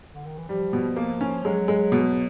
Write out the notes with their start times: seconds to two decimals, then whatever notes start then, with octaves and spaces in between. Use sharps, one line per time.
0.14 D3
0.26 D#3
0.38 E3
0.49 F3 G3
0.73 B2
0.96 A#3
1.21 C#4
1.44 F#3 G#3
1.68 G#3
1.92 B2